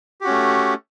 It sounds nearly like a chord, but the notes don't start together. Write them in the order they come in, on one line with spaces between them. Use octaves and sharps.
G4 F#4 C#4 A3